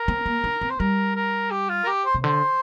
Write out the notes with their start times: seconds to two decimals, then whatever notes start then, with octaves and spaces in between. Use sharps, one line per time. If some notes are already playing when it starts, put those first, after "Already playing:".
Already playing: A#4
0.08 C4
0.26 A#3
0.44 D4
0.61 C4
0.70 C5
0.79 G3 A#4
1.15 A#4
1.51 G4
1.69 F4
1.84 A#4
1.87 G4
2.06 C5
2.15 C3
2.24 D3 C5